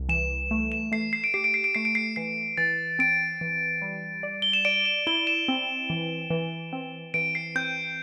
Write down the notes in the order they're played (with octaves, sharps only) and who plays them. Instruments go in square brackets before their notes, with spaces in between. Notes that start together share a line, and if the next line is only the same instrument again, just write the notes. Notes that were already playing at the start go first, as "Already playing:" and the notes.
Already playing: [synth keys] C2
[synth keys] E3 [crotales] E7
[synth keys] A3
[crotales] E7
[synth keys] A3 [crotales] C7
[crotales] C7
D7
[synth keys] G4 [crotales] C7
[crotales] D7
C7
D7
[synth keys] A3 [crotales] C7
[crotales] D7
C7
[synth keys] E3 [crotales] C7
[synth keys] E3 [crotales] A6
[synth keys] C4 [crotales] D7
[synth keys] E3
G3
D5
[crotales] G7
E7
[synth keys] D5 [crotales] D7
[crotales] E7
[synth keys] E4 [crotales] G7
[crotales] E7
[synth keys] C4
E3
E3
C4
[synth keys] E3 [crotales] D7
[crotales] C7
[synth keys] C4 [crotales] G6